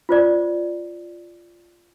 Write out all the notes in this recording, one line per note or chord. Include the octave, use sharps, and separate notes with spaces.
F4 C5 D5